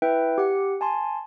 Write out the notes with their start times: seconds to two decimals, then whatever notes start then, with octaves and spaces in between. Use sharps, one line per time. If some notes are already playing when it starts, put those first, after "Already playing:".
0.02 E4 B4 E5 G5
0.38 G4 F#5
0.81 G#5 A5 C6